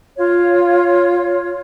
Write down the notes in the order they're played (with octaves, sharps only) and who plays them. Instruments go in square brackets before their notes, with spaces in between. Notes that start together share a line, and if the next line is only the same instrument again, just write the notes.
[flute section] F4 C#5